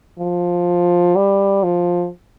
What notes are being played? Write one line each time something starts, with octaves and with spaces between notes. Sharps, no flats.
F3
G3
F3